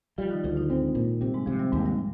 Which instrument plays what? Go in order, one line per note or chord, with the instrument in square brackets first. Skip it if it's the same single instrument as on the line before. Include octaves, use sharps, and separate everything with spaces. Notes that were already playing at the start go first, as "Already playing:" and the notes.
[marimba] F3 F4 [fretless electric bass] G3
[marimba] D#3 D#4
[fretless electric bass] D2 [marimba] F3 F4
[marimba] D#3 D#4
[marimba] G#2 G#3 [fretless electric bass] C4
[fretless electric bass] A#2
[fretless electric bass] C3 [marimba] G3
[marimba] G#2 G#3
[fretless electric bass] C3 [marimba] F3
[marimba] G3
[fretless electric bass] D#2 [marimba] G#2 G#3
[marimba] G3
F3